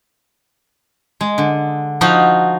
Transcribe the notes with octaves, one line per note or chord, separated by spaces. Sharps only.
G#3
D3
F3 D#4 F#4 F5